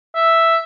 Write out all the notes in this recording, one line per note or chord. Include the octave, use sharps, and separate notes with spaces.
E5